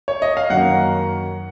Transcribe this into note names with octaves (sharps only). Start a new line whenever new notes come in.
C#5
D#5
F5
F#2 D#3 A#3 C#4 F#5